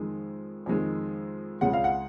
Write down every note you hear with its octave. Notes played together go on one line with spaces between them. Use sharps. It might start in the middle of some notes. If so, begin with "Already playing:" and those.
Already playing: F2 D#3 G#3
F2 D#3 G#3
C#2 C#3 G#3 F#5
F5
F#5